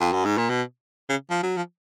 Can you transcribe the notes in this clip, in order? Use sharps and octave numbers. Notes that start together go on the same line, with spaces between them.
F2
F#2
G#2
A#2
B2
C#3
F3
F#3
F3